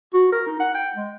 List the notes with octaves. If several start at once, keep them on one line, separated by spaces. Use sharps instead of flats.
F#4
A#4
D#4
F#5
G5
G#3